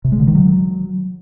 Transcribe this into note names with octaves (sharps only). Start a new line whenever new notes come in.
C3
G#3
D3
D#3
F#3